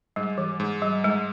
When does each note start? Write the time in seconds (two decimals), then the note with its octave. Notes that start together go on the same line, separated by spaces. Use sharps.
0.16 G#2 G3
0.38 E3
0.60 G#2
0.82 G3
1.04 G#2 G#3